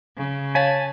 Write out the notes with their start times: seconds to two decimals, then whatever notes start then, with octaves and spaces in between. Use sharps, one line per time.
0.17 C#3
0.55 C#5 F5 G#5 A5 B6